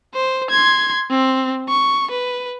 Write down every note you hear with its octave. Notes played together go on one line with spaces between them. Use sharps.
C5
C6 G#6
C4
C#6
B4